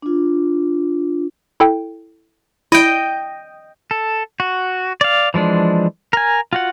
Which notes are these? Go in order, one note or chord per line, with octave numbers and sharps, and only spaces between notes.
D4 F4
E4 A4 G5
E4 D#5 G5
A4
F#4
D5 F5
E3 F3 G#3 D4
A#4 G#5
F4 F#4 F#5